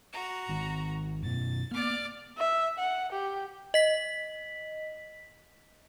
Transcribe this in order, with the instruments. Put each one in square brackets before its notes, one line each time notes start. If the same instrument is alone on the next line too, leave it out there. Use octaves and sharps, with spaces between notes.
[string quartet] F#4 A#5
[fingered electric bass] G#1 D#3
[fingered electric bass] F#2 B2 [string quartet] A6
[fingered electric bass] A#3 B3 [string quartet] D5 D6 F6
[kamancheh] E5
F#5
G4
[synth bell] D#5 B6